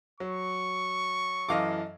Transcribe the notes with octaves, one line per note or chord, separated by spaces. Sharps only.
F#3 C#6
F#2 E3 A4 D#5 F5 D6